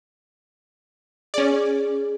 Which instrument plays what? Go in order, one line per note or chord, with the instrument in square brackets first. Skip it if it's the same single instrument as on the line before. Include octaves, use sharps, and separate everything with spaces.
[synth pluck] C#4 D5 [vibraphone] G#4